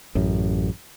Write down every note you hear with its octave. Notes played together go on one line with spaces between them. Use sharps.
A1 F#2